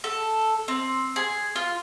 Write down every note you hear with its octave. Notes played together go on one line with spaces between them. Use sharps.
A4
C4
G#4
F4